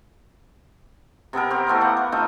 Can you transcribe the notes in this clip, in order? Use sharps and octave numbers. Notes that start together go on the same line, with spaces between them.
C3 B3 A4 A#4
C4 G4
E3 A3 B3 C6
A#3 B3 F#5
A#4
A3 C4 D#4 F4